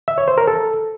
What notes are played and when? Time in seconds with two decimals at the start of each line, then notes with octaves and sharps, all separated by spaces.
0.08 E5
0.18 C#5
0.28 C5
0.38 A#4
0.48 A4